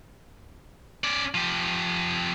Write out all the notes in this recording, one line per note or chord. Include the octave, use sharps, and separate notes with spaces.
C#4 D5
F3 G4